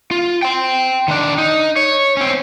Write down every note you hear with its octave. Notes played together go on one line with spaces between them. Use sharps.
F4
G5 C6
D#3 D4
D#4
C#5
C4 C#4